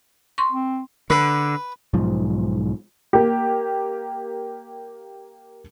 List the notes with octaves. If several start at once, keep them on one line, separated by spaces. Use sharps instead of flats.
C6 C#6
C4
D3 B4
B1 G#2 F3
A#3 G4